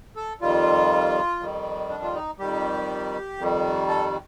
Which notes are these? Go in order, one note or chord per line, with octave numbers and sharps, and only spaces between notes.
A4
F2 D#3 G3 F4
F2 D#3 G3
D4
F4
D#4
F2 D#3 G3 G4
F2 D#3 G3
A4